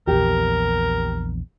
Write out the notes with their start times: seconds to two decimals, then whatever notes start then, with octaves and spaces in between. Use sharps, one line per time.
0.07 A#1 E2 G4 A#4